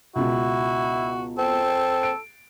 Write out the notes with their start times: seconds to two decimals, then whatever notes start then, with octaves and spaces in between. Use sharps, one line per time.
0.16 C#2 B2 E4 F#4
1.38 C4 A4
2.03 D7